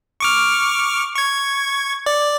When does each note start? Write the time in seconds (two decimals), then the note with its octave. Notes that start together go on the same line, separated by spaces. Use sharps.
0.20 C#6 D6 F6
1.16 C#6 G#6
2.06 D5